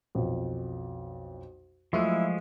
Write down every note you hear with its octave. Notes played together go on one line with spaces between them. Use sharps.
B1 F2
F3 F#3 G#3 A3 E4 F4 C#6 E6